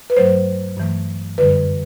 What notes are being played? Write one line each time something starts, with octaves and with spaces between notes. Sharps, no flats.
B4
G2 F#3 A3 C5
G2 E3 A3
F#2 D3 G3 B4